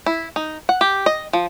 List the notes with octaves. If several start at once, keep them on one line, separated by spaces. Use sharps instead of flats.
E4
D#4
F#5
G4
D#5
F3